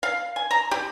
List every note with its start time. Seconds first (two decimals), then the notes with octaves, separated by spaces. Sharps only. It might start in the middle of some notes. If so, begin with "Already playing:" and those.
0.03 F5
0.36 G#5
0.51 A#5
0.71 G4